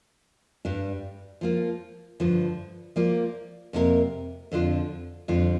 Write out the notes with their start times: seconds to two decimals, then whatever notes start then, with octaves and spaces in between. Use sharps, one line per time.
0.65 G2 G3 D4
1.41 F3 A#3 F4
2.20 G2 D3 F3
2.96 F3 A#3 F4 D5
3.73 F2 C3 A#3 G4 A#4
4.52 F2 D3 F3 D4 F4
5.28 F2 D3 G3 C4 F4